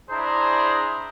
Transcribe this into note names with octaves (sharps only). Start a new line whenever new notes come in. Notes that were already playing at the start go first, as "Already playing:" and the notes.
D4 E4 G#4 C5 A#5